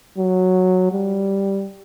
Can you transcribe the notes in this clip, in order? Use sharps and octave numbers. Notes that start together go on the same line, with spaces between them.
F#3
G3